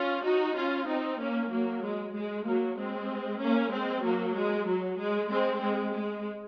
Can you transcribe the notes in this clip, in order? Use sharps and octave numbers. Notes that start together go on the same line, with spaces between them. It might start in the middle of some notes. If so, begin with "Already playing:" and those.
Already playing: C#4 F4
D#4 F#4
C#4 F4
C4 D#4
A#3 C#4
F#3 A#3
G#3
G#3
F#3 A#3
G#3 C4
A#3 C#4
G#3 C4
F#3 A#3
G#3
F#3
G#3
G#3 C4
G#3
G#3